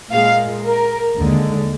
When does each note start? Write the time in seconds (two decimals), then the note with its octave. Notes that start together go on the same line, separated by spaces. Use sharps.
0.12 A#2 G#3 F5
0.65 A#4
1.17 D#2 D3 G#3